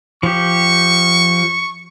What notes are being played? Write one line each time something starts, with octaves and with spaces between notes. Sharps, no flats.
F3 G4 C#6